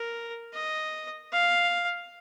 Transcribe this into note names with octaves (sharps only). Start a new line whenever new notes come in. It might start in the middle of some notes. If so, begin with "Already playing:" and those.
Already playing: A#4
D#5
F5